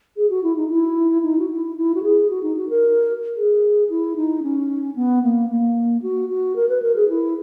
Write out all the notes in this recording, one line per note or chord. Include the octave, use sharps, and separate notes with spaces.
G#4
F#4
E4
D#4
E4
D#4
F#4
E4
E4
F#4
G#4
F#4
D#4
F#4
A#4
G#4
E4
D#4
C#4
B3
A#3
A#3
F#4
F#4
A#4
B4
A#4
G#4
E4